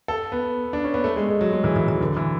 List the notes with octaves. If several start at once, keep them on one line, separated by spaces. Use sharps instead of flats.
A4
B3
D4
C#4
B3
A3
G#3
G#3
F#3
G#3
E3
E3
E3
D3
E3